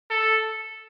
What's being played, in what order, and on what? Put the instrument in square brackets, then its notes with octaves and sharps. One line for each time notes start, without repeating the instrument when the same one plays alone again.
[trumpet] A4